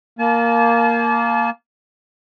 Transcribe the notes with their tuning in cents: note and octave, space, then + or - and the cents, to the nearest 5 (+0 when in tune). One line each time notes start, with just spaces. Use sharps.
A#3 +0 A5 -40